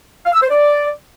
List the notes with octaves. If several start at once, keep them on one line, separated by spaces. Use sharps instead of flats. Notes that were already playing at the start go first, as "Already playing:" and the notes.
F5
E6
C5
D5